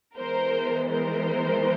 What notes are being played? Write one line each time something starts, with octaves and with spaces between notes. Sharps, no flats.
E3 G#3 B3 A#4 C5
A#4 C5